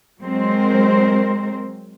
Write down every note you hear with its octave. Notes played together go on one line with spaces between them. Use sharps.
F#3 G#3 C4 A#4 C5